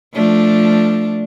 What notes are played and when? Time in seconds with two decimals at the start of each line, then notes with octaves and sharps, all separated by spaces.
0.14 F3 A3 D4